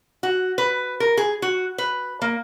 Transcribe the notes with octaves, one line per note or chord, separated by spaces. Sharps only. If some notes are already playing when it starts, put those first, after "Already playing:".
F#4
B4
A#4
G#4
F#4
B4
A#3